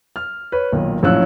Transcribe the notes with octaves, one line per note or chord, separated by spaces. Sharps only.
F6
B4 C#5
B1 A#2 D#3
A#1 A2 F#3 C#4 E6 F#6